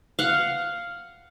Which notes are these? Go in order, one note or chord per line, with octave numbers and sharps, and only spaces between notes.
F5 F#5